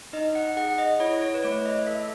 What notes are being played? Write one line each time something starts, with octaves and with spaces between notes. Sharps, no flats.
D#4 D#5
F#5
G#4 F#5
D#5
E4 C#5
C#5
B4
A3 C#5
D#5
A4 E5